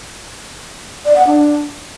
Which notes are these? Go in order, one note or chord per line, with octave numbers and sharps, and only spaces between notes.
D5
F#5
D4